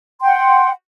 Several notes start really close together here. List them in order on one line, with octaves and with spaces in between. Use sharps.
C6 G5 F#5